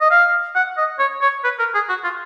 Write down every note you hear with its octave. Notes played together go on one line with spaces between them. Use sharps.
D#5
F5
F#5
D#5
C#5
C#5
B4
A#4
G#4
F#4
F4